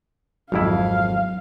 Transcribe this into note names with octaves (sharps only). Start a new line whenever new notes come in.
G#1 F2 F#3 E4 F5